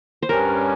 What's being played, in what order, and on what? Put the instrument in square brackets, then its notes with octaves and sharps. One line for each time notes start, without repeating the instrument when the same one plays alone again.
[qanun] C5
[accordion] G2 G3 C#4 [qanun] A#4